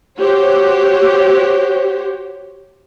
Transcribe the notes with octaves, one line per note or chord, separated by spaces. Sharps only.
F#4 G4 C5 C#5